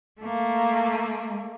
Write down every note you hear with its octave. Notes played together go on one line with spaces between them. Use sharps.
A3 A#3